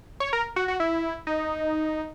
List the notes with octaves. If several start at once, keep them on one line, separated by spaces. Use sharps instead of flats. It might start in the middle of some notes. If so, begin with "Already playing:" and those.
C#5
A#4
F#4
F#4
E4
D#4